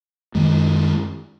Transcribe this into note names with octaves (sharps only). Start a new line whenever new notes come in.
F#2 D#3 G#3